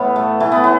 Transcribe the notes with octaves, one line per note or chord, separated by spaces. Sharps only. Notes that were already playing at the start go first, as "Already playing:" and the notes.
Already playing: A2 E3 B3
A3
E3 A3
B3
A2 B3